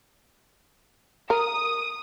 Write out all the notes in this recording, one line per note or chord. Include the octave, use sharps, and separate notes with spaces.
A#4 D#6